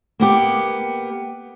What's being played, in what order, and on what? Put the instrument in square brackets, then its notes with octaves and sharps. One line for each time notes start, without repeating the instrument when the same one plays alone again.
[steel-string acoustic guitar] A#3 B3 G4